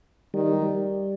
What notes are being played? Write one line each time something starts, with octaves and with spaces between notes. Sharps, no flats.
D#3 G3
G3